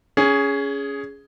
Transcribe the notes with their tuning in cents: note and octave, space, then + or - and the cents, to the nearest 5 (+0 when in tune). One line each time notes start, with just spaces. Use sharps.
C#4 +20 G#4 +0